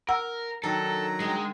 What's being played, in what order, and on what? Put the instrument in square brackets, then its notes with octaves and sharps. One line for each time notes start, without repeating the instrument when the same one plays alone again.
[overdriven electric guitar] A#4 [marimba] F#5 E6
[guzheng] D#3 D4 [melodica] F#3 A#5 [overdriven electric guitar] A4
[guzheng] D3 G3 D#4 [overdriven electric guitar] G#3